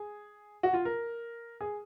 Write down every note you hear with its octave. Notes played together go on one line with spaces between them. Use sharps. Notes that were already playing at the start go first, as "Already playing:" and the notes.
Already playing: G#4
F#4
F4
A#4
G#4